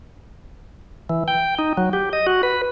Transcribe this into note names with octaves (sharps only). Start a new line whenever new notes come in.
E3
G5
D#4
F#3
G4
D#5
F#4
B4